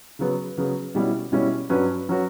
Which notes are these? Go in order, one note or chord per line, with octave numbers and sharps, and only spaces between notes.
C#3 F#3 B3
C#3 F#3 B3
B2 G3 C#4 E4
B2 G3 C#4 E4
G2 F#3 C#4 F#4 B4
F#3 C#4 F#4 B4